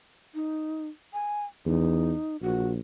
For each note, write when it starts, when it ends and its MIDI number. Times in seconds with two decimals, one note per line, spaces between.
0.34 0.88 63
1.13 1.45 80
1.66 2.13 40
1.66 2.37 63
2.42 2.79 34
2.42 2.69 66